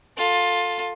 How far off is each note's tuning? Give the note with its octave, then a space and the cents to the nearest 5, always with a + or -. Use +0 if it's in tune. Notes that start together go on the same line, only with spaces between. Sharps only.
F4 +15 A4 +10